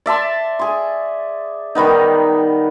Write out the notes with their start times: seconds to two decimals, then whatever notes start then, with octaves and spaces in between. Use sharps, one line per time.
0.06 D5 E5 A5 C6
0.59 G#4 C6
1.75 D#3 G3 B3 D#4